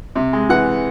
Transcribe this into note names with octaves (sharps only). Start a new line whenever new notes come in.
C3
G#3
E3 F#5